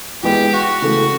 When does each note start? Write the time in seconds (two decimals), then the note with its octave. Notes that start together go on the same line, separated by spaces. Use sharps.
0.23 E3 G#3 B3 E4 G4
0.53 F#4
0.82 C#3 E3 A3